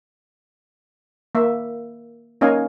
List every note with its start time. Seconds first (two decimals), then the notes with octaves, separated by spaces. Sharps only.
1.35 A#3 E5
2.41 A#3 C#4 D#4 D#5 F5 G#5